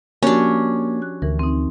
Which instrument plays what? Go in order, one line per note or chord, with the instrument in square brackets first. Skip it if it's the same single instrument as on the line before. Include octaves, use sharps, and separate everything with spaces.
[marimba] F3 F#4 G4 [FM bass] A#3 [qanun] C#4 D4
[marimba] F#6
[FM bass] D2 [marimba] E3 A#4
[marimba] C4 D#4